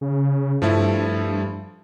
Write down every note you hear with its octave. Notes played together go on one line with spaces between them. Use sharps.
C#3
G2 F3 A3 E4